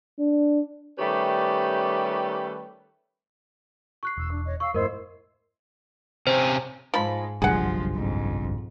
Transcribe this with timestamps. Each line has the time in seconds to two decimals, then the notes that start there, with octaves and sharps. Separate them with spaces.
0.19 D4
0.98 D#3 G3 A3 C#4 G4 B4
4.03 C#6 F#6 C7
4.18 E1 E6
4.31 D4
4.45 C#5 D#5
4.60 F5 C#6 E6
4.74 F2 G#2 A3 E4 A#4 C5 D#5 E6
6.27 C3 C#4 C5
6.94 G#2 F3 G#3 B5
7.42 F#1 B1 G2 F3 G#3 G#4 F#5
7.95 F2 G#2